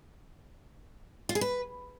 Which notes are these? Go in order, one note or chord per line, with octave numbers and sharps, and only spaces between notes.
F4
G#4
B4